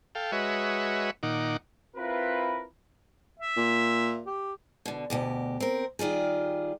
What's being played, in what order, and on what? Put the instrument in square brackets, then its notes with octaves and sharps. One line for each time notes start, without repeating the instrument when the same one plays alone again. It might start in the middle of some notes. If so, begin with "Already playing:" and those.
[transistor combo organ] A4 F5 G5
G#3 F#4 B4 C#5 D#5 E5
A#2 D#3 D#4 F#5 D6
[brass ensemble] C4 E4 F4 A#4 B4
[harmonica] E5
[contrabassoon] A#2
[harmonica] G4
[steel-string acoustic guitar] B2 D3
D2 B2 G4
C4 A#4
D#3 G3 F4 G#4